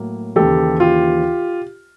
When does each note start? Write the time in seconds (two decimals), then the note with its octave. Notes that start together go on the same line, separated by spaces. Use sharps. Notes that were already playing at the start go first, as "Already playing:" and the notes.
Already playing: A2 F#3 A#3
0.36 D#2 C#3 E3 G4 A4
0.80 F4 G4